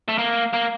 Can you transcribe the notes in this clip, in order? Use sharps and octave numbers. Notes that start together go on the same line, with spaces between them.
A3
A#3
A#3